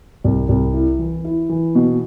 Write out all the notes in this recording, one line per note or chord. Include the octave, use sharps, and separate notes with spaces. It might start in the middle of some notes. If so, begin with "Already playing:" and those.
C2
C2
E4
E3
E4
E3
B2